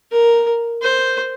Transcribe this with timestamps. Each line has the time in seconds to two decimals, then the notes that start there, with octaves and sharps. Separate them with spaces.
0.12 A#4
0.82 C5